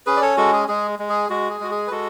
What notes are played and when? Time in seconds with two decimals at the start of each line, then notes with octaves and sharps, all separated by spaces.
0.06 C#4 G#4 B4
0.17 D5
0.22 A4 C#5
0.37 G#3 F#4 A4
0.53 G#4
0.68 G#3 G#4
0.99 G#3
1.09 G#4
1.30 G#3 F#4
1.50 G#4
1.60 G#3 F#4
1.71 G#4
1.87 B4
1.91 G#3 F#4 A4